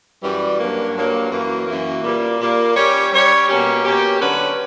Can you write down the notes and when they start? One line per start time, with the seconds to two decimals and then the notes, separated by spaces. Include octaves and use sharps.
0.23 F#2 E3 G3
0.59 G2 F#3 A#3
0.94 G2 F#3 A#3
1.31 F#2 E3 A#3
1.66 F#2 E3 A#3
2.03 A#2 G3 A#3
2.40 A#2 G3 A#3
2.75 G3 C#4 G4 C#5
3.12 G3 C#4 G4 C#5
3.47 B2 A#3 C#4 G4
3.84 B2 A#3 C#4 G4
4.19 D3 F#3 C#4 F#4 B4